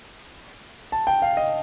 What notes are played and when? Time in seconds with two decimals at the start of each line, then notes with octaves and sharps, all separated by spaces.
0.92 A5
1.07 G5
1.22 F5
1.37 D#5